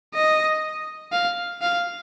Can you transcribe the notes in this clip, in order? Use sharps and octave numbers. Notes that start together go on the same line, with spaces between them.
D#5
F5
F5